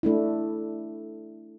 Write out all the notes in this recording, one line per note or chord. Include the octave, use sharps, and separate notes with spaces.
A3 D4 E4